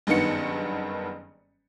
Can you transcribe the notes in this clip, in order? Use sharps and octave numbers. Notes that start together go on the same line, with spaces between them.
F#1 G2 D#3 B3 C#7